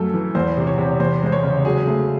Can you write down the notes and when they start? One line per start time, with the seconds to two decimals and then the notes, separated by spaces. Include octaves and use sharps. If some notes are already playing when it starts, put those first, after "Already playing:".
Already playing: F#2 A3 A4
0.14 E3
0.35 E2 C5
0.57 C3
0.67 C#5
0.78 C3
1.00 E2 C5
1.22 G#3 C5
1.32 C#5
1.43 C#3
1.65 F#3 G#4
1.87 A3